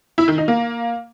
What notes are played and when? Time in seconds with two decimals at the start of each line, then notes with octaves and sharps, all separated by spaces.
0.18 E4
0.28 D#3
0.38 D#4
0.48 A#3